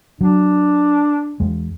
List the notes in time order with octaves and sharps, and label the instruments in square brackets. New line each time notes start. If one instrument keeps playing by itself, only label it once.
[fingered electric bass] F#3 [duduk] D4
[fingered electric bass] E2 G#3